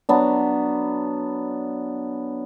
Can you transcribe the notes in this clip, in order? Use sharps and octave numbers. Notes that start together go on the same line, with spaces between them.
F#3 B3 D4